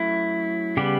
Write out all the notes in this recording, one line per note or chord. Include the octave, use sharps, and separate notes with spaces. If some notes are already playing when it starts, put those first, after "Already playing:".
Already playing: F#3 A3 C#4 E4
C#3 G3 B3 G4